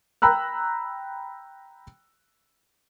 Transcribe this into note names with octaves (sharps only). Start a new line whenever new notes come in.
G5 A#5 B5 E6 F#6